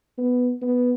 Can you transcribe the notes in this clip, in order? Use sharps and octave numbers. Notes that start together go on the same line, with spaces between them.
B3
B3